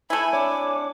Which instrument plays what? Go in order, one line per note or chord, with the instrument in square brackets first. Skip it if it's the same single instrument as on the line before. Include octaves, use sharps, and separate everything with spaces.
[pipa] A3 E4 [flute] G#5 [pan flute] B5
[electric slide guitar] D4 C#5 [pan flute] D6